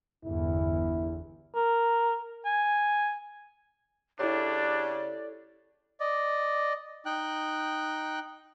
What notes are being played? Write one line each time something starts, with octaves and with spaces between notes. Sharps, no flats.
G1 E2 E4
A#4
G#5
C#3 D4 E4 G4 A4 C#5 D5
D5 D#5
D#4 G5 F#6